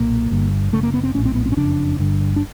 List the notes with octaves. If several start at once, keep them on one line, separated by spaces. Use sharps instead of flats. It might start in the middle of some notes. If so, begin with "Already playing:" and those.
Already playing: B1 A#2 A#3
G1 G2 D3
F#1 E2 C#3 A3
A#3
B3
C4
A#1 A2 C#4
C4
B3
C4
C#4
F#1 F2 C#3 D4
G1 G2 D3
D4